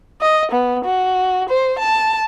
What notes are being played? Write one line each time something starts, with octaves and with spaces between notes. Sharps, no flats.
D#5
B3
F#4
C5
A5